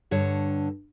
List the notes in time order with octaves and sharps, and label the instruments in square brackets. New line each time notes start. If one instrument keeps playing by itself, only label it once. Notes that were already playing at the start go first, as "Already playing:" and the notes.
[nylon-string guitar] G2 D3 C#5